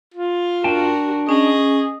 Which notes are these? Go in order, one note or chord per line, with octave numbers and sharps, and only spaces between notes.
F4
D4 F#4 A#4 G5 A5
C#4 G#4 D#5